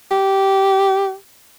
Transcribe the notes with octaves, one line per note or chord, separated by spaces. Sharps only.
G4